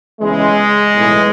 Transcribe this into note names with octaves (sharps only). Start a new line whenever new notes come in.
E2 C#3 E3 G#3
B1 A2 E3